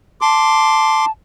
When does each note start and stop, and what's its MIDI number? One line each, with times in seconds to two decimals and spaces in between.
0.21 1.10 81
0.21 1.05 84
0.21 1.05 86